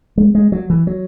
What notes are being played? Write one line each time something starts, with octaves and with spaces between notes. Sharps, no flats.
G#3
G#3
F#3
E3
F#3